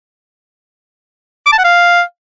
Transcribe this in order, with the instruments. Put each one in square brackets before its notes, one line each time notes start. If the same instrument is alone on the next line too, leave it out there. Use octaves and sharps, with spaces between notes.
[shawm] D6
A5
F#5
F5